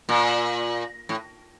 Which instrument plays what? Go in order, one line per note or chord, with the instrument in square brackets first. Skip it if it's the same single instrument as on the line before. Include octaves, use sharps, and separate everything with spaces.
[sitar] A#2
A2